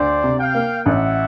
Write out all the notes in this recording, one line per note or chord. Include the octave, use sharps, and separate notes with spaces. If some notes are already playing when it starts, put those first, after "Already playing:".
Already playing: D2 C5 D5
C3
F5 G5
A#3
A1 E5 F#5